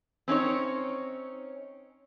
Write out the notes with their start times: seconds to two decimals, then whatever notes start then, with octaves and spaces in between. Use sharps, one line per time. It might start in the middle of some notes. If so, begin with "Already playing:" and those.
0.28 C4 C#4 D#4 C#5